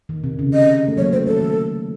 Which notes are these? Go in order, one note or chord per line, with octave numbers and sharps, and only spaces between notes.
D#3
C3
C#3
D#5
A3
F#3 A#3 C#5
A3 C5
F#3 A4
D#3